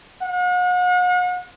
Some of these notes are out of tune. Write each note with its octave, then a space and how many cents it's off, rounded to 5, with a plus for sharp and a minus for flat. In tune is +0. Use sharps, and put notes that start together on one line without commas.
F#5 -40